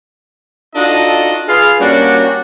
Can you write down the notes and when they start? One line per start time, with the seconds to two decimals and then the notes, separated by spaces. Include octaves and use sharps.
0.76 D4 D#4 F4 F#4 A4 D#5
1.49 F4 G#4 B4 F5
1.81 G3 A#3 C#4 D4 F#4